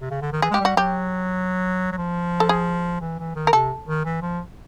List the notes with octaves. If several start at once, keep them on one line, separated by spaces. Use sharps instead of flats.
C3
C#3
D3
D#3
E3 G#4
G#3 G4
G3 F#4
F#3 G4
F#3
F3
A4
G#4
E3
E3
D#3
A#4
C3 A4
D#3
E3
F3